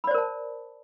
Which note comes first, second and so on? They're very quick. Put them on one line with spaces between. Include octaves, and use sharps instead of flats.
B5 D5 C5 A#4 A5